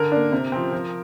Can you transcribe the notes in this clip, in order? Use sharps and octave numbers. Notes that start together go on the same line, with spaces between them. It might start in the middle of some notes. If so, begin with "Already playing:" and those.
Already playing: D3 A#4
A#3 D4
C3
F3 C4
F3